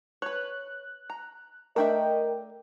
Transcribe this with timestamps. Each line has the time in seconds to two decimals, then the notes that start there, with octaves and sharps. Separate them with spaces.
0.22 B4 C#5 F#6
1.10 A#5
1.76 A3 D4 A#4 D#5 E5 G5